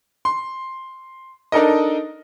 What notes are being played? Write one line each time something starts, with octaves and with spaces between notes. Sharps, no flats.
C6
D4 D#4 A4 A#4 D#5